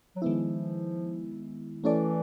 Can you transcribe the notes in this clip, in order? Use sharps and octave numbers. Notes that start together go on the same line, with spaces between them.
F#3
D#3 F3 G#3 B3 E4
E3 A3 C#4 E4 A4 D5